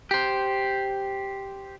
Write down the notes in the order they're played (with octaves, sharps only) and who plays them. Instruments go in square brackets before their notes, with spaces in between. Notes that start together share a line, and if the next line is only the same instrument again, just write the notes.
[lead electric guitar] G4 C5